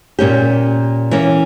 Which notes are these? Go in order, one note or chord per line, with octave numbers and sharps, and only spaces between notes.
A#2 A#3 C#4 G4
E3 A#3 C#4